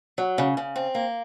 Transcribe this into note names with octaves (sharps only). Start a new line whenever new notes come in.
F#3
C#3
C#3
C4
A#3